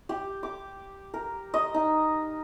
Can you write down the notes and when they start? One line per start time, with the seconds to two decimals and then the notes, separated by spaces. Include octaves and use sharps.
0.09 G4
0.43 D6
1.14 A#4
1.54 D#5
1.74 D#4